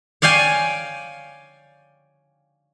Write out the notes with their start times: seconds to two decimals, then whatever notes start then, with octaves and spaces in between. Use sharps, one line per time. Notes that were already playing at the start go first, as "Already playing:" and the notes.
0.22 C#5 D5 F5 G5 G#5